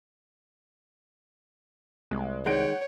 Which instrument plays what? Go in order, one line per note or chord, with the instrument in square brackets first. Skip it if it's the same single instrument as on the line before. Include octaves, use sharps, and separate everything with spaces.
[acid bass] C2 [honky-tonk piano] G#3
[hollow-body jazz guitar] D#3 G#3 [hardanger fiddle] C#5 [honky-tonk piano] F#5 G6 D7